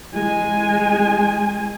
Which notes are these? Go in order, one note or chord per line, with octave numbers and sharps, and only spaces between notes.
G#3 G#5